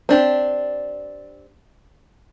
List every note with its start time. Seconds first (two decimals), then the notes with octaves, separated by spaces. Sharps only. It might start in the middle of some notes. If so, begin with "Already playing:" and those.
0.09 C4 D4 G4